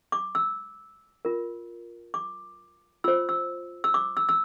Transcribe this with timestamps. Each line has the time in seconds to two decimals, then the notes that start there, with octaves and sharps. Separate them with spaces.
0.12 D6
0.35 E6
1.25 F4 A#4
2.14 D6
3.04 F4 C5 E6
3.29 E6
3.84 E6
3.94 D6
4.17 E6
4.29 E6